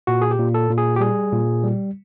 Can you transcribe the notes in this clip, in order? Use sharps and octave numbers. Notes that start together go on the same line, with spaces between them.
A#2 F#4
G#4
G4
A#2
A4
A#2
G#4
G4
G3 G#4
A#2
G3